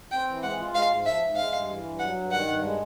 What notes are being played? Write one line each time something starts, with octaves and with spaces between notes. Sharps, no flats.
C4 G5
E3
G#3 F#5
F4
G#3 F5
G#2
F3 E5
G#2
G#3 F5
G2
E3
G2
F#3 F#5
G2
D#3 F#5
G2
G#3